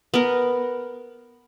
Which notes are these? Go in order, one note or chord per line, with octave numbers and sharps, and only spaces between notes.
B3 A#4